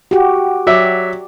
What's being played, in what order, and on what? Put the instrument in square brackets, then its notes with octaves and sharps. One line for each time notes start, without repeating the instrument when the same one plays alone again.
[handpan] F#4 G4
[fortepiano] F#3 E5 [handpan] D5